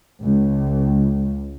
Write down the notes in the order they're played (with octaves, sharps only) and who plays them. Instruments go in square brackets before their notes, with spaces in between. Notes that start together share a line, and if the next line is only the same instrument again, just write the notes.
[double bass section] C#2